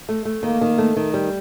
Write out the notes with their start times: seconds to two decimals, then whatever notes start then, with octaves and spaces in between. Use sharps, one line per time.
0.09 A3
0.25 A3
0.43 D#3 A#3
0.61 D#3
0.78 A3
0.96 D#3
1.14 G3